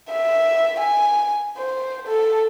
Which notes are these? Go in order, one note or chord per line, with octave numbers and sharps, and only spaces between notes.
E5
G#5
C5
A4